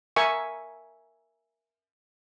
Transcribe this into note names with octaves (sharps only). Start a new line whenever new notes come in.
A#4 E5 G#5 C#6